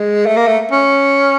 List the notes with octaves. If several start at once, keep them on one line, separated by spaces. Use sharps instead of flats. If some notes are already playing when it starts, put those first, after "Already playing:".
Already playing: G#3
A3
A#3
A3
C#4